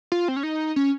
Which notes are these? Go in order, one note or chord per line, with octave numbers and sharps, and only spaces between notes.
F4
C4
C#4
D#4
C#4